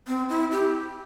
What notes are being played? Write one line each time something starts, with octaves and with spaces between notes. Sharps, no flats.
C4
E4
G4